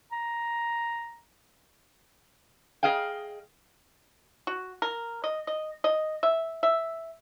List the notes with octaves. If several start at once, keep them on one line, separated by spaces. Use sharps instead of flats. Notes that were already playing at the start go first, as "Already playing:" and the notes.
A#5
G#4 D#5 F5 G5
F#4
A#4
D#5
D#5
D#5
E5
E5